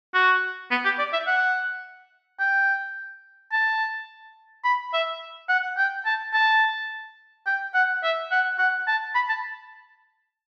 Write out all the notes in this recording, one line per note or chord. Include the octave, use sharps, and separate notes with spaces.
F#4
B3
G4
D5
E5
F#5
G5
A5
B5
E5
F#5
G5
A5
A5
G5
F#5
E5
F#5
F#5
A5
B5
A5